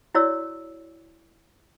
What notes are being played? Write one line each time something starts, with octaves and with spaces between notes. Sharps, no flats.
E4 F#4 C#5 D5 E6